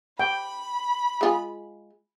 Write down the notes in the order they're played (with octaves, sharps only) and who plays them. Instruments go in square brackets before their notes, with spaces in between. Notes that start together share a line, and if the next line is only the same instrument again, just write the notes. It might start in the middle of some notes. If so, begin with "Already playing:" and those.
[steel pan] G5 [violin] B5
[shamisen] G#3 F4 G#4